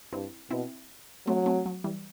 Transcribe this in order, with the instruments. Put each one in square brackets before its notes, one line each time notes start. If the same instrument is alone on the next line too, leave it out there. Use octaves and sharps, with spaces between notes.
[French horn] G2 [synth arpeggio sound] C4 E4
[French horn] B2 [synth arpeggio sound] C4 E4
[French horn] F#3 [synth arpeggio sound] A3 C4
[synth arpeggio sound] A3 C4
F#3
E3 G3